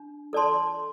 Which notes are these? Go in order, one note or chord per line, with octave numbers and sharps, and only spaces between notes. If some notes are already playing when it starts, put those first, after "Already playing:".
Already playing: D4
A4 D5 A5 C6